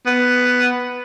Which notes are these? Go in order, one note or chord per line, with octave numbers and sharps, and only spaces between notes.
B3